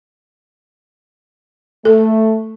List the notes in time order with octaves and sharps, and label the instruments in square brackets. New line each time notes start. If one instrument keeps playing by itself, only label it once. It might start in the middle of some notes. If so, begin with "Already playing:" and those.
[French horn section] A3 [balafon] A4